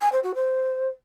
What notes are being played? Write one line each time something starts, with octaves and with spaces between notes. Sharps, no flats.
G#5
C5
F#4
C5